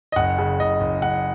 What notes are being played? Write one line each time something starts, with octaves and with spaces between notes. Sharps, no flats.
D#5
F#1 F#5
C#3
F#1 D#5
F#1
F#1 F#5